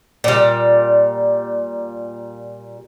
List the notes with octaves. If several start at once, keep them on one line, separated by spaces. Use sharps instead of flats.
A#2 G3